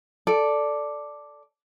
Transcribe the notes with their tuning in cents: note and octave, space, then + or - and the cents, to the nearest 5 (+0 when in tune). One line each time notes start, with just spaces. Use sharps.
A4 +0 D5 +0